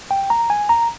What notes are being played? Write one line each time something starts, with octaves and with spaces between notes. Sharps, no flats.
G5
A#5
G#5
A#5